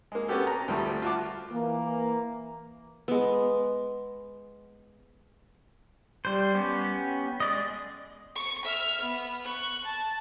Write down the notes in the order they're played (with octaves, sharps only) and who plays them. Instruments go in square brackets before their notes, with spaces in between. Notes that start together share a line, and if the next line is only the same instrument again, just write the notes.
[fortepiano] G#3 A#3
A#3 B3 C#4 F#4 G4 A4
A#5
D2 F3 G3 A3
F4 F#4 A5 D6
[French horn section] E3 A#3
[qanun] G#3 B3
[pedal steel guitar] G3 C5
B3 C#4 G4
G#3 D5 D#5
[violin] C#6 C#7
E5 F6
B3
C#6 F#6
A5